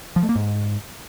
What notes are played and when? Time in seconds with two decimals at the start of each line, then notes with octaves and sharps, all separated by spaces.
0.16 F3
0.23 A3
0.29 A#3
0.35 G#2